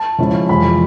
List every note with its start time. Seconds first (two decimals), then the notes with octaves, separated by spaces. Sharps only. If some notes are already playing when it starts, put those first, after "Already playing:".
Already playing: A5
0.19 C#3 F3 G#3 C#4 E4
0.49 F2 C3 E3 G#3 B5